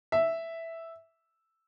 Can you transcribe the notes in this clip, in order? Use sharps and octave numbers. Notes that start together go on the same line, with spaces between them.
E5